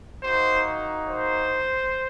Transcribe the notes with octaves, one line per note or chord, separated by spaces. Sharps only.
A#3 D#4 F#4 C5
C5